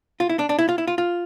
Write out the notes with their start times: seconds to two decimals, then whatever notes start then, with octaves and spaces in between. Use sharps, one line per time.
0.20 F4
0.29 E4
0.39 D4
0.49 D4
0.59 E4
0.69 F4
0.78 E4
0.87 F4
0.98 F4